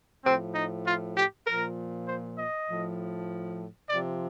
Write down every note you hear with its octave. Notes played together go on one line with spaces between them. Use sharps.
A2 F3 C4
D#4
F4
G4
A#2 F3 A#4
C5
D#5
A2 F3
C3 F3 D5